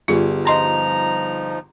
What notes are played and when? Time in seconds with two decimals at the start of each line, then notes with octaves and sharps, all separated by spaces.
0.08 G1 G3 F4 G#4
0.47 F3 D#4 D#5 A#5 C6